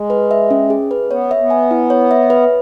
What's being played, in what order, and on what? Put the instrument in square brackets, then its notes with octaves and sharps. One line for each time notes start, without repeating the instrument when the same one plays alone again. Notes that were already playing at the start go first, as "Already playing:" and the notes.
Already playing: [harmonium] G#3
[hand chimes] B4
E5
C#4
G#4
B4
[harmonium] B3 [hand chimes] C#5
[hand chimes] E5
[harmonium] B3
[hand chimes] G#5
E4
C#5
E5
B4